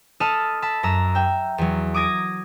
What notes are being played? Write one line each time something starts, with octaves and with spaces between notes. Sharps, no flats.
A4 D#5 A5 B5 E6 F6
A5 B5 E6
F#2 A#5 E6
E5 G5
E2 F#3
D6 D#6 G#6 A#6 D7